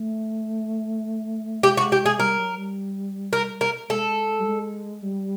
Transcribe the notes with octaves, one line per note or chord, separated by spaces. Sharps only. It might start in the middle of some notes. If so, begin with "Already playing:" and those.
Already playing: A3
G#3 G4
F#4
G4
G#4
G3 A#4
F#3
G3
A#4
A#4
G#3 A4
G3
G#3
G3